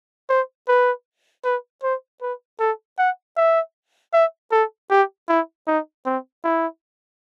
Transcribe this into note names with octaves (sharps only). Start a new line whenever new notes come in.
C5
B4
B4
C5
B4
A4
F#5
E5
E5
A4
G4
E4
D#4
C4
E4